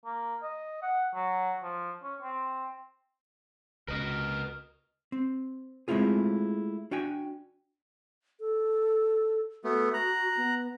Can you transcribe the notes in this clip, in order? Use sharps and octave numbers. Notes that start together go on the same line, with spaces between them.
A#3
D#5
F#5
F#3
F3
C#4
C4
C#2 C#4 A#4 B4 D#5
C4
G#3 A3 C4 E4 F4 G#4
D4 F#4 G5 G#5
A4
A3 B3 F#4
A#5 F#6
B3